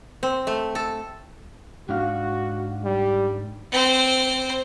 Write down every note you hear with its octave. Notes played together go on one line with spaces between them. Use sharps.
C4
A3
A4
G#2 D4 F#4 F5
G3
C4 C5